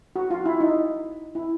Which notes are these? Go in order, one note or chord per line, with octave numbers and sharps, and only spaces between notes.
F#4
F4
E4
D#4
E4